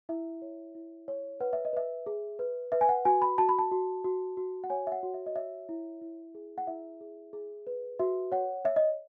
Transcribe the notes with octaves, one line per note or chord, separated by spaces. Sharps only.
E4 E5
C#5
E4
C#5
B4 F#5
E5
D#5
B4 E5
G#4
B4
B4 E5
G#5
F#5
F#4 G#5
B5
F#4 A5
B5
A5
F#4
F#4
F#4
F#5
C#5 G#5
E5
F#5
F#4
E5
D#5
C#5 E5
E4
E4
G#4
F#5
E4 E5
G#4
G#4
B4
F#4 E5
C#5 F#5
C#5 E5
D#5